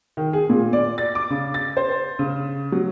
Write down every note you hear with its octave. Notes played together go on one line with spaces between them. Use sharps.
D#3
G#4
A#2
D5
A6
D6
C#3
A6
C5
C#3
F#3